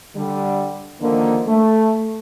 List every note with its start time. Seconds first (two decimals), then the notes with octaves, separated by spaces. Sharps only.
0.15 D3 G3
1.01 D3 D#3 F3 A#3
1.46 A3